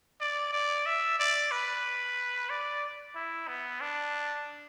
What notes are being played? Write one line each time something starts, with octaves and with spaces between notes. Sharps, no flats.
D5
D5
E5
D5
B4
D5
E4
B3
D4